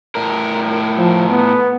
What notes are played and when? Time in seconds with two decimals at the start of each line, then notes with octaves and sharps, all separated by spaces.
0.15 A2 A#4
0.97 F3
1.30 B3